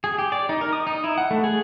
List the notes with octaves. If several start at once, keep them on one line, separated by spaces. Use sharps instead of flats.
G#4
G4
D5
D#4
A#4
D#6
D#4
E4
F#5
A3
G#4